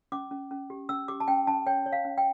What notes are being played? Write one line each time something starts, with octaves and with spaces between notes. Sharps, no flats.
C#4 D6
C#4
C#4
G4
C#4 E6
G4 D6
A5
C#4 G5
C#4 A5
C#5 G5
C#5
F5
C#4
G5